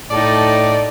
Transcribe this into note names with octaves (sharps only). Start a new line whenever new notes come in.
A2 D#4 A4 D5